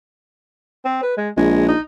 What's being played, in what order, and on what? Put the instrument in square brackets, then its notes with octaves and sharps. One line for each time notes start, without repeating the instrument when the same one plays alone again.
[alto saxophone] C4
B4
G#3
[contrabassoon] A#1 [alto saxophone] G#3
[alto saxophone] D#4